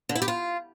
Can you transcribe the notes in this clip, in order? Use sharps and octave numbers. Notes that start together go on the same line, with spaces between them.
D3
E4
G4
F4